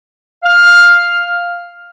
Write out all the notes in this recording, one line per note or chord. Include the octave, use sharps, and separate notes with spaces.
F5 F6